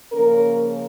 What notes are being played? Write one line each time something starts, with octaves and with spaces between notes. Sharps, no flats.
C#3 F3 A#3 C#4 A#4